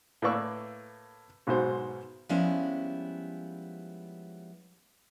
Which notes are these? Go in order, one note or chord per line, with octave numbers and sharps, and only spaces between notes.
A2 A#3 B4 D5 C#6 E6
B1 G#2 B2 C5
F3 G3 G#3 B3 C#4 E4